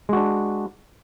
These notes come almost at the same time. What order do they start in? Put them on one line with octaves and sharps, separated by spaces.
G#3 F#4 D4